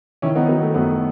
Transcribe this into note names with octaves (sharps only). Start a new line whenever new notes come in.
D#3 C#4 E4
B3 D#4
F#3 B3
A3
F#2 B3